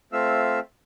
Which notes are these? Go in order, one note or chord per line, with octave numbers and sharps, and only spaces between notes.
A3 C4 F4 E5 F5 E6